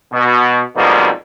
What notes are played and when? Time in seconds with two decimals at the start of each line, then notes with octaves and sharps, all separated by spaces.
0.13 B2
0.76 F2 G#2 B2 F3 G3 A#3